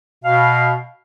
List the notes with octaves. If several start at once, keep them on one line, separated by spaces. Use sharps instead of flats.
B2 F5